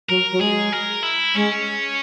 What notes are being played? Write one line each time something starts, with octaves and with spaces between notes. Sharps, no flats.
F#3 A#4
F#3
G#3 G#4
A#4
E4
G#3 C#4